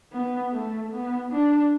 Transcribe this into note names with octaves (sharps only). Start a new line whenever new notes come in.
B3
A3
B3
D4